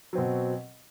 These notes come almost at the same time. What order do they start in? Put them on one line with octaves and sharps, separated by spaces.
F#3 C4 B2